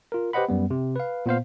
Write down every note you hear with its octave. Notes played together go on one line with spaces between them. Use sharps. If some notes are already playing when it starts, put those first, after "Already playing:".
F4 A#4
G4 B4 C5 D#5 F#5 B5
F#2 G3 B3
C3
B4 F5
A#2 B3 C5 F5